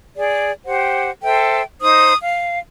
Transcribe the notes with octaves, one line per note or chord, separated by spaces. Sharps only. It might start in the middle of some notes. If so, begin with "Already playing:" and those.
G#4 D5
G4 C5 F#5
A4 C5 E5 G5
D#4 C5 D#6
F5